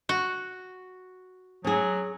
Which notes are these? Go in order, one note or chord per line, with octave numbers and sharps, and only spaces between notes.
F#4
F#3 C#4 G#4